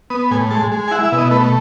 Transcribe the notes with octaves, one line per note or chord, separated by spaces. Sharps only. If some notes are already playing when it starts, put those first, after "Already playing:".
B3 D#6
A2 G#5
G#3 A5
G#3
G#5
E4 F#5
E5
B2
D#5
A3 B4